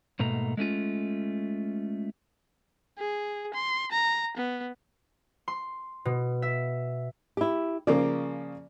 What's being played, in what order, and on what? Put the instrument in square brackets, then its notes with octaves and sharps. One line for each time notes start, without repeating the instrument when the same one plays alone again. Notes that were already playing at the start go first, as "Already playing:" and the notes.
[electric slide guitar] G#2 B2 A3 A#3 A#5
G#3 A3 C#4 F4
[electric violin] G#4
C6
A#5
B3
[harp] C6
B2
E5
[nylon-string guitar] E4 G4
[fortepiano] C#3 F3 A#3 [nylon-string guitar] D5